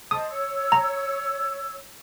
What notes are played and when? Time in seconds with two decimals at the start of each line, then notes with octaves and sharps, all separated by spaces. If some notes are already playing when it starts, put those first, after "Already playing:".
0.11 C5 D#5 A5 D#6
0.31 C#5 E6
0.72 A#5